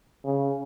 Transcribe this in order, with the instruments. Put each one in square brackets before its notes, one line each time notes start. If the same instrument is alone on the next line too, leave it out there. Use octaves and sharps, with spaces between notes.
[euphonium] C#3